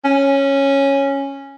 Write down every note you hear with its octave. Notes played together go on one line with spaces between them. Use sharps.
C#4